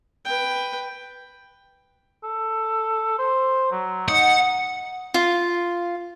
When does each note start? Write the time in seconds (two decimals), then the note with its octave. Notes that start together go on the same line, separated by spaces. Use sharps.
0.25 B4 G5
2.24 A4
3.19 C5
3.71 F#3
4.08 D#4 F#5
5.14 F4